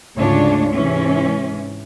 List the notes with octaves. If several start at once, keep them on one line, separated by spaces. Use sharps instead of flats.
D2 G#2 C#3 D4 F4 C#5
G#2 C3 E3 C#4